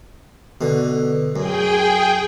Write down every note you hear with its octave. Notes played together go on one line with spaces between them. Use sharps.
B2 D3
F#2 G#4 G5